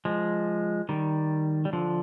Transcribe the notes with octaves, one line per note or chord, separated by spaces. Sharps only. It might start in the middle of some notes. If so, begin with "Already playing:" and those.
F3 G#3
D#3 G3
G3
D3 F3